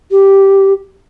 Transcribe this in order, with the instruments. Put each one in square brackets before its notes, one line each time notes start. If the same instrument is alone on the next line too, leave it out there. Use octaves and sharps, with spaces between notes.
[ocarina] G4